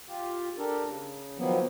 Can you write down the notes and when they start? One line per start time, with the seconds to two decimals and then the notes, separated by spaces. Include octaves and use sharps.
0.08 F4 G4
0.58 D4 G4 A4 A#4
0.85 C#3
1.38 D#3 F3 F#3 A#3 B3